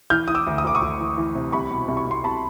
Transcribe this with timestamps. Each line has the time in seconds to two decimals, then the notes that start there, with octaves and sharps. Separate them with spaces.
0.10 E3 F6 G6
0.28 E3 D#6
0.35 D6 E6
0.47 D2
0.58 D#6
0.64 D2 D6
0.75 C#6 D#6
0.82 D2
1.00 E3
1.17 E3
1.35 C3
1.52 C2 B5 C#6
1.71 B2
1.88 C2
1.97 C#6
2.07 C2 C6
2.24 C2 A5 B5